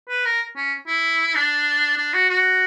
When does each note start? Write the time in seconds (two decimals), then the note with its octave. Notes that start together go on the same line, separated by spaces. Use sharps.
0.09 B4
0.25 A#4
0.56 C#4
0.87 E4
1.35 D4
1.97 D4
2.13 F#4
2.29 F#4